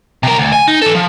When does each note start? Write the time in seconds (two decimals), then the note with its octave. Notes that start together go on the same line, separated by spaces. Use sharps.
0.23 C3 A#4
0.38 D2
0.53 G#5
0.68 D#4
0.82 E3 A4
0.95 F3